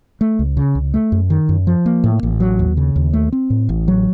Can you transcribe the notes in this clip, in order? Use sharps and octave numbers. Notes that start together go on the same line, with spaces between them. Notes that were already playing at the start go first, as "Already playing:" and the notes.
A3
C#2
C#3
C#2
A3
F#2
D#3
F#2
F3
A#3
A2
A1
F#3
D#2
C#3
D#2
A3
C4
A2
A1
F#3